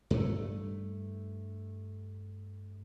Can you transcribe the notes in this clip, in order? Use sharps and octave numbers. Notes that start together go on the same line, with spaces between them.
G2 A3